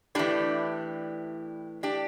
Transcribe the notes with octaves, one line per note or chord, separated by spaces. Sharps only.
A2 E3 D4 G4
D4 G4